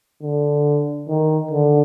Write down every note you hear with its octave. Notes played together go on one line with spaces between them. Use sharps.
D3
D#3
D3